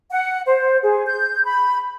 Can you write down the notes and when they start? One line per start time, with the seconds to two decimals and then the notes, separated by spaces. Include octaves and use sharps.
0.11 F#5
0.46 C5
0.83 G#4
1.07 G6
1.44 B5